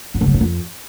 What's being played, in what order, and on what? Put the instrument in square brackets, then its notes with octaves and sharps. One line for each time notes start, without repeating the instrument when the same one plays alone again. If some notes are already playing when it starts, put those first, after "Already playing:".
[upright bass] F#2
C#3
F#3
G#2
F2